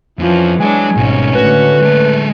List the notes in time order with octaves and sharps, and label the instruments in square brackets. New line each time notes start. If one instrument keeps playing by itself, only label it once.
[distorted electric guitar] F2 [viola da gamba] E3 F3 C#4
[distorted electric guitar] F#3 C#5 [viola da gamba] G#3 D4 [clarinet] G#5
[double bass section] G#1 [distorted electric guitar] B2 G3 [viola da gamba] C#4
[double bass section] A2 D3 A3 [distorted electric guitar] F#4 [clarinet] B4
[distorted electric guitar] G#3 A4